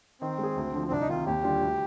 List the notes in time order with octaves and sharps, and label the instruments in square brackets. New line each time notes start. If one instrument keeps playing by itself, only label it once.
[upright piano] D#3 [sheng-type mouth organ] C4
[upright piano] G#3 D#4 G#4
D2
D3 F3
[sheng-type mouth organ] C4
[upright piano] C2 [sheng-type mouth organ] D4
[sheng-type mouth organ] D#4
[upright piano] C3 D#3 [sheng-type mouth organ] F4
[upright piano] D#2 [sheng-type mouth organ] G4
[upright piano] D3 G3 D4 F4
D2